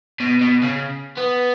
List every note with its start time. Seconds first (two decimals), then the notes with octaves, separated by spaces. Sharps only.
0.20 B2
0.41 B2
0.62 C#3
1.18 B3